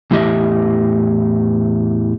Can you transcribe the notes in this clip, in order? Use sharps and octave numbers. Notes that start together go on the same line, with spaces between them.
E2 A2 E3 G4 D#5 E5